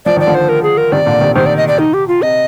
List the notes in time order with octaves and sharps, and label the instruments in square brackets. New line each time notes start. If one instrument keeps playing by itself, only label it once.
[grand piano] F3 [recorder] D5
[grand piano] D#3 [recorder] D5
[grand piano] D3 F3
[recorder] C5
A#4
G#4
A#4
[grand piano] C3 D#3 [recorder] D5
[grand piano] A#2 D3
C3 D#3
[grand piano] C3 D#3 [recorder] C5
[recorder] D5
D#5
D5
D#4
G4
F4
[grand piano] C3 [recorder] D#5